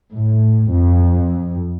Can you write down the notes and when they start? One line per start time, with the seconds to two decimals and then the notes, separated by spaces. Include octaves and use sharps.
0.14 A2
0.72 F2